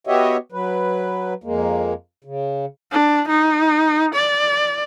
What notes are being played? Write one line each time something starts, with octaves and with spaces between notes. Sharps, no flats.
B3 F#4 G4 C#5 D#5 E5
F#3 B4
F2 G#3 A#3
C#3
D4
D#4
D5